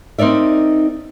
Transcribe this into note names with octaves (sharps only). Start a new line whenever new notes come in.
C4 D#4 A#4 D5 E5